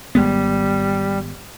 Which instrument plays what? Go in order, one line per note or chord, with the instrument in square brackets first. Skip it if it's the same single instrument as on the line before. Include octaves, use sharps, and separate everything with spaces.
[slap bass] G#1 G#3 B3 [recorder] G3